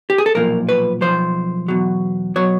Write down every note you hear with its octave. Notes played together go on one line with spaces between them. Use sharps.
G4
G#4
A4
B1 A#2 F3 A#4
B4
B1 A#2 F3 C5
E2 B2 F#3
B2 F#3 C#5